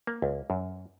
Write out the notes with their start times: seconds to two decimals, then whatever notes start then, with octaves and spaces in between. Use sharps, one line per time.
0.07 A#3
0.22 C#2
0.50 F#2